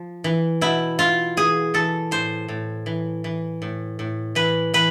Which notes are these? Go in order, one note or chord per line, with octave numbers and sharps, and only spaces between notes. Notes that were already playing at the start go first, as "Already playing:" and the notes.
Already playing: F3
E3
B2 E4
E4 F4
E3 G#4
E3 A4
A2 C5
A2
E3
E3
A2
A2
E3 B4
E3 B4